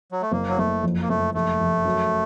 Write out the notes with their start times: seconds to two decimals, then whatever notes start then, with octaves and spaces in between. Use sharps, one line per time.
0.12 F#3
0.22 A3
0.32 F#1 A#3
0.49 F#3
0.58 F#1 A3
0.83 F2
1.02 A#3
1.09 F#1 A3
1.34 F1 A3
1.60 F1
1.85 F#2